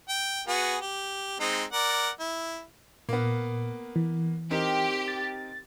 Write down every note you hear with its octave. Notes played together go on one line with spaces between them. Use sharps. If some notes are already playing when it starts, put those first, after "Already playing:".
G5
B3 F#4 G#4
G4
G#3 C4 D#4
A#4 D5 F#5
E4
A#2 A#3 B3
E3
C4 D#4 G4 A#4
A6